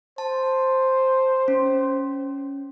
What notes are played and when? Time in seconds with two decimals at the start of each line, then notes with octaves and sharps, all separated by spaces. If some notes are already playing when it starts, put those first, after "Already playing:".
0.18 C5 A5
1.48 C#4